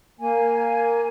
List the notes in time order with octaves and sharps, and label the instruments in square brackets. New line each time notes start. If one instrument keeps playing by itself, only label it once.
[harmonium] A#3 [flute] G#5